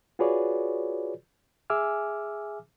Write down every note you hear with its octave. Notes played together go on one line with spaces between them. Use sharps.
F4 F#4 G#4 B4 C#5 D5
G#4 E5 G#5 D6 E6 F6